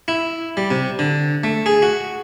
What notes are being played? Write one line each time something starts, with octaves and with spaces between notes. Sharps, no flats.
E4
G3
C3
D3
A3
G#4
F#4